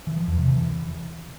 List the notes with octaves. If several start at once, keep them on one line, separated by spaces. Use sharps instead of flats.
E3
F3
E2
C3
E3